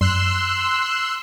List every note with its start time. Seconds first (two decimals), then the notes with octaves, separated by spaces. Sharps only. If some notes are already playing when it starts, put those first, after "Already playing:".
0.01 F#2 C6 E6 F#6